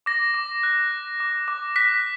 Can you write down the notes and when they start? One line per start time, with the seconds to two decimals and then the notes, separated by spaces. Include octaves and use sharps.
0.06 D6 A#6
0.34 D6
0.63 F#6
0.91 F#6
1.20 D6
1.48 D6
1.76 F#6 B6